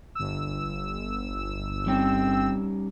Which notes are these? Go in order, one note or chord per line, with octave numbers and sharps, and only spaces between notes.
G1 E6
G3 C4 C#4 D#4